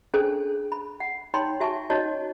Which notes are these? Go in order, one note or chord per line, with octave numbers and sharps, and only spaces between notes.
C#4 D4 G#4 A4 C5 G#5
B5
F#5
D#4 C#5 G5 B5 C6
F#4 E5 G#5 A5 C#6
C#4 D#4 F#4 C#5 D#5 A5